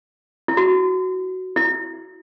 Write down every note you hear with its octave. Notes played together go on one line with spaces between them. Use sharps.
E4
F#4
E4